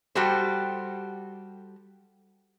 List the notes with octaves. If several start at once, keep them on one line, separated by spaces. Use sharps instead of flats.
G3 F#4 G4 A4 C5